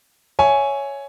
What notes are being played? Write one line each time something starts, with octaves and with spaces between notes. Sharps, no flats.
C#5 E5 G#5